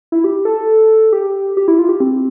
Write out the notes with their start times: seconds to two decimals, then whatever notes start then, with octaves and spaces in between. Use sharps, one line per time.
0.12 E4
0.24 G4
0.45 A4
1.13 G4
1.57 G4
1.68 E4
1.79 F4
1.89 G4
2.00 C4